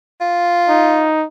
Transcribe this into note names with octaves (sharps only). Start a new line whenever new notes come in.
F4
D#4